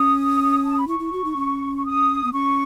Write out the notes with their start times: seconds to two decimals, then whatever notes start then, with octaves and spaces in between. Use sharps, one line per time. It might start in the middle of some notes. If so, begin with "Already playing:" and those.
Already playing: C#4 D#6
0.64 A5
0.77 B5
0.88 E4 C#6
0.99 E4
1.13 F#4
1.24 D#4
1.36 C#4
1.76 C#6
1.85 D#6
2.24 B3
2.33 C#4 C#6